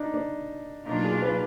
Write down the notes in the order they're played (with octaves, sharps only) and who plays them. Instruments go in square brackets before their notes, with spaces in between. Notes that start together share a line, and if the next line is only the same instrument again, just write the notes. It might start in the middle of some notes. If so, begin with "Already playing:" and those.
Already playing: [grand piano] D4 D#4
D4
[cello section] B2 F#3 A#3 D4 F4 [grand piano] D#4
[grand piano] G#4
B4